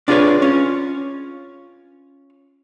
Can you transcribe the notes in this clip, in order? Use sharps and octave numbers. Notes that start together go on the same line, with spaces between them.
D4 F4 G#4 A#4 B4 C#5
C#4 F4